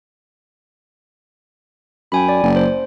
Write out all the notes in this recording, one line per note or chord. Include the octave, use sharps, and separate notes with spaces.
F#2 G5 G#5 B5
D5
F#1
C5